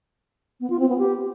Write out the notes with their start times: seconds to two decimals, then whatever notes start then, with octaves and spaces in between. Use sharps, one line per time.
0.60 B3
0.70 F4
0.80 C4
0.89 B3
0.99 G4